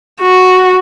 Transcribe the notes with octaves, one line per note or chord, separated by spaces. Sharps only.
F#4